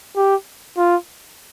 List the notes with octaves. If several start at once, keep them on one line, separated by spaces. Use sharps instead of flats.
G4
F4